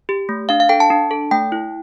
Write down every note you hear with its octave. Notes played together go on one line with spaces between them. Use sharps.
G4
A3
D4 F5
F5
A4 G5
A5
D4
A4
A3 G5
E4